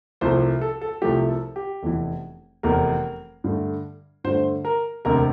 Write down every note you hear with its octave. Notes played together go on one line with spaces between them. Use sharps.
C2 C3 F3 A3 C5
A4
A4
C2 C3 F3 A3 G4
A4
G4
F1 E2 E3
F1 E2 E3 A#4
G2 D3 A3
G2 D3 A3 C5
A#4
E1 D2 C3 A#4